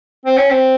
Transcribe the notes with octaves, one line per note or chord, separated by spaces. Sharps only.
C4
C#4
C4